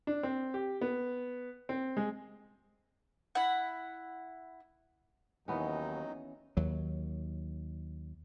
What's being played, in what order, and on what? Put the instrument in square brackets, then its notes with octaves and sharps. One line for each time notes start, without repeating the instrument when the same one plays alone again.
[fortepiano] D4
C4
G4
B3
C4
G#3
[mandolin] E4 F#5
[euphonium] D#2 [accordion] D#3 F#3 D#4 [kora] E3 B3 C#4
[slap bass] D#2 F#3